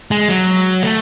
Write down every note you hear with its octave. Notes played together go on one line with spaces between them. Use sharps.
G#3
F#3
A3